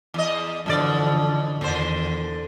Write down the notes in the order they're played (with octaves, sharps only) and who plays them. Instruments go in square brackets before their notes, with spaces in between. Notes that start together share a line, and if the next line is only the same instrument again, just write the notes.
[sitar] E2 D#5
[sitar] F#2 B2 D5 [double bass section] D3 E3 F3
[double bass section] E2 D#3 [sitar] A#2 D3 C5